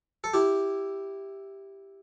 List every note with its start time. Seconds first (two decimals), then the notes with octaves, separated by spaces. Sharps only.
0.24 A4
0.34 E4 G4